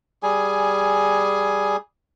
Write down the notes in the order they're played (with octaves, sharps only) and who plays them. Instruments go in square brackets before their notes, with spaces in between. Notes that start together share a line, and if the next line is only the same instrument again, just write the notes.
[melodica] G3 G#4 G#5